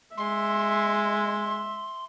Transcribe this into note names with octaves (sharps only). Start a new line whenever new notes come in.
G#3 E5 C6